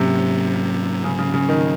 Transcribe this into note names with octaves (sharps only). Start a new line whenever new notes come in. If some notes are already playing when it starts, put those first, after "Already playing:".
Already playing: G#2 C3 F#3 A#3 C#4
C#3
C#3
C#3
D#3